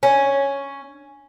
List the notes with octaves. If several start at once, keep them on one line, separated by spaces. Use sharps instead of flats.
C#4